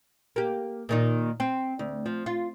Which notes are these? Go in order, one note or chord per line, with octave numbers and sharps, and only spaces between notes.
A#3 G4
A#2 D#3 D#4
C4
D2
F3
F4